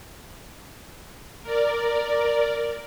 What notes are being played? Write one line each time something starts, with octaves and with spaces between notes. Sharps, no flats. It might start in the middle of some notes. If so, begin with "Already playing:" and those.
A#4 D5